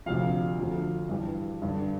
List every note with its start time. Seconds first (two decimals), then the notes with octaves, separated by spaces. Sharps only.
0.06 D2 C3 F3 F5
0.58 D2 D3 F3
1.09 G2 E3 G3
1.62 G2 D3 G3